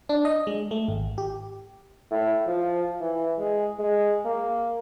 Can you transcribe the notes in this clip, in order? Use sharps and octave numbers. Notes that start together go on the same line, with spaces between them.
D4
D#5
G#3
A3
G#1
G4
A2
F3
E3
G#3
G#3
A#3